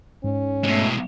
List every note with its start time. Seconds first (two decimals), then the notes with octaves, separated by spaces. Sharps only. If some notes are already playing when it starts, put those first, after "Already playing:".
0.24 G#2 C#4
0.64 B2 G#3 A3